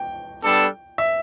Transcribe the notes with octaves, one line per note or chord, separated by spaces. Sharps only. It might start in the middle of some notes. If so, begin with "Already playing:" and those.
Already playing: G5
G3 B3 D4 A4
E5